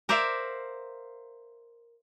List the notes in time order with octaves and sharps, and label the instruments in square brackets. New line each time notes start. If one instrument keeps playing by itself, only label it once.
[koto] A#4 C5 D5 E5 F5